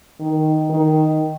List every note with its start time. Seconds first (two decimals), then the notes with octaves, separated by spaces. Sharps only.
0.20 D#3
0.70 D#3